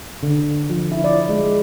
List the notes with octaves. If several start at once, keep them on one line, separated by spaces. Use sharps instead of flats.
D3
F3
E4
D5
G#3